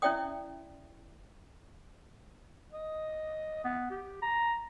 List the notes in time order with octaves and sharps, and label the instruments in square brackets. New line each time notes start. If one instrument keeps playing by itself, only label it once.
[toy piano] C#4 E4 D5 E5 G5 D#6
[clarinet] D#5
B3
G4
A#5